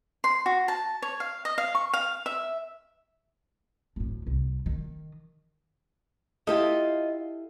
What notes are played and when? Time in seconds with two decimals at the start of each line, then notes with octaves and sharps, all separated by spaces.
0.24 C6
0.46 F#4
0.68 A5
1.02 C#5
1.20 F5
1.45 D#5
1.58 F5
1.75 C#6
1.94 F5
2.26 E5
3.96 D2 A2
4.27 C2
4.66 D#3
6.47 E4 F4 G4 A4 D#5